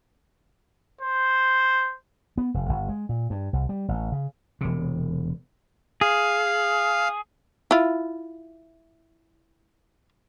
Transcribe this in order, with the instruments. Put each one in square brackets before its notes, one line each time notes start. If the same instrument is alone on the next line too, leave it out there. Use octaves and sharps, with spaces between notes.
[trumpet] C5
[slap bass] B3
F1
G1
G#3
A#2
G2
C2
G3
A1
C#3
E1 C3
[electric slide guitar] G#4 [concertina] F5
[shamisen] E4 F4